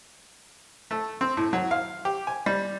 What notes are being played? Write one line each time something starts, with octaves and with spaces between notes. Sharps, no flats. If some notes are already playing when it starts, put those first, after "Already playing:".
A3
C4
A2
F#3
F5
G4
G#5
G3